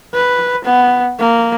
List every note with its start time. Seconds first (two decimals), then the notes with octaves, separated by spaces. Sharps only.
0.14 B4
0.65 B3
1.19 A#3